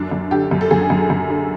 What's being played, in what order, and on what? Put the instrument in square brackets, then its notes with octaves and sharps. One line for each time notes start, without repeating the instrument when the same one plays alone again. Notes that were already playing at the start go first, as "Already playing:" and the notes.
Already playing: [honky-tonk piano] F#2 D4
F#2
D3 G4
F#2
A4
F#2 G#4
F#2
F#2
D3